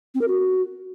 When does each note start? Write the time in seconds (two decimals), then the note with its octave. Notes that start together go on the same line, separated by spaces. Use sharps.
0.15 C4
0.21 A#4
0.28 F#4